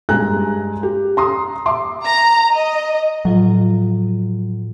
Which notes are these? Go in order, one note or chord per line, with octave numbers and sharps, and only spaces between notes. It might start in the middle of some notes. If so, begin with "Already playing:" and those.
G2 G#3 G#5 A#5 F#6
G4
A#5 C6 D#6
E5 C6 D6
A#5
D#5
A2 F3 F#3 F4